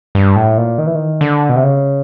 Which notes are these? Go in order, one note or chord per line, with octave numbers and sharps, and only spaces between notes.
G2
A2
A#2
D#3
E3
D#3
D3
B2
C3
C#3